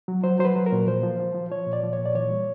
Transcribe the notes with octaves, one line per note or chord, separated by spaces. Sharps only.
F#3
F#3 C5
F#3 C5
B4
F#3
A#4
A#2
F3 C5
F3
F3
F3
F3 C#5
A#2
D5
F3
C#5
A#2
D5
E3 C#5
G3